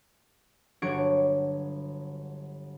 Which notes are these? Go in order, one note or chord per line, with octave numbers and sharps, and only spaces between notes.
G1 F#3 D4 C#6 G#6 D7